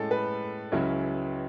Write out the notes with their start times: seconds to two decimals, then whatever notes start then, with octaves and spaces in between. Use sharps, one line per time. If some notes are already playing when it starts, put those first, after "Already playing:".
Already playing: A2 G#3 C#4 A4
0.11 B4
0.72 C#2 C#3 F#3 C#4 E4